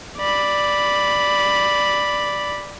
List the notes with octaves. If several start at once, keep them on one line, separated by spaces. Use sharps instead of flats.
D5 B5